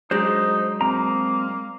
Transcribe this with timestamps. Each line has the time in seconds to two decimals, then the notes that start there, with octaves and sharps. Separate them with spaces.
0.11 F#3 G#3 D4 D#4 C5
0.81 A#3 C4 A#5